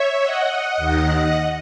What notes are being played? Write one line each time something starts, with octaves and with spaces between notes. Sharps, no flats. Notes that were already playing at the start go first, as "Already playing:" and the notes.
Already playing: C#5 E5
D#5 F#5
D#2 D#3